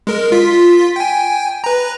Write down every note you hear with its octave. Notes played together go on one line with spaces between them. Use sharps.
G#3 A#4
F4 B6
G5 G#5
B4 A#5